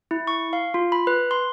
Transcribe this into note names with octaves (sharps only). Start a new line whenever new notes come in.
E4
C#6
F5
F4
B5
B4
C6